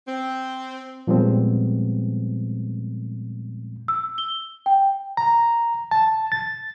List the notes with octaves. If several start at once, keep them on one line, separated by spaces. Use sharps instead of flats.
C4
A#2 F3 G3 G#3 B3 C4
E6
G7
G5
A#5
A5
A6